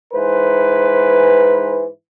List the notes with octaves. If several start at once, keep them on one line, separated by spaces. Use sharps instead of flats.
G#2 E3 B4 C5